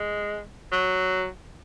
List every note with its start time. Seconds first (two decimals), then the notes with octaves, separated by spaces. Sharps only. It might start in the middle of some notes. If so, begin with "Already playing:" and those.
Already playing: G#3
0.72 F#3